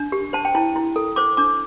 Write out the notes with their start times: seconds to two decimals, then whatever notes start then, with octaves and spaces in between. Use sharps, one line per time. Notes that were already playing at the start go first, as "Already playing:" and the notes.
Already playing: D4
0.12 G4
0.33 C5 A5
0.45 G5
0.55 E4 A5
0.76 E4
0.96 A4
1.16 C5 D6
1.37 D4 D6